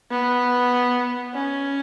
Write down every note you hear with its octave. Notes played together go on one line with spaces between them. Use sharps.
B3
C#4